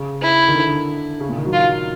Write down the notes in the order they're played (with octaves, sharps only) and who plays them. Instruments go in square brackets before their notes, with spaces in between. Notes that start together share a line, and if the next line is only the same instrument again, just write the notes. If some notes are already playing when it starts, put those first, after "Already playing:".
Already playing: [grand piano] C#3
[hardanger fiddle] E4
[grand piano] D#3
D3
C#3
A#2
D#3
F#3
[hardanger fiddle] F4